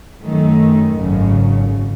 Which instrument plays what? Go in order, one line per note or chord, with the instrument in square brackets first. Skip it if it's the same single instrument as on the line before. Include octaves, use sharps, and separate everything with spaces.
[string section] F#2 D#3 A3
G#1 F#2 C#3